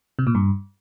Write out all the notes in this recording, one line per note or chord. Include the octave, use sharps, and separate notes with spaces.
C3
A#2
G2